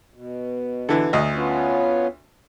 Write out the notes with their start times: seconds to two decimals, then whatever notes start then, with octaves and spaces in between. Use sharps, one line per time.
0.14 B2
0.89 D3 E3
1.13 D2 D#5
1.34 B3 C#4 F4